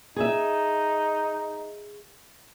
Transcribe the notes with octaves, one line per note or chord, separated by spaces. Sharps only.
D#4 G#4 E5